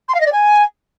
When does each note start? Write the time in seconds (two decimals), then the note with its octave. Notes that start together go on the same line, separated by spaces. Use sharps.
0.08 C6
0.14 F5
0.20 D#5
0.26 D5
0.32 G#5